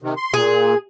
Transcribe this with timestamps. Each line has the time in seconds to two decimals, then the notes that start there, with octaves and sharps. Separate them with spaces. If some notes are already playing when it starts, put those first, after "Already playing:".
0.02 C3 D#3
0.17 C6
0.34 A#2 G#4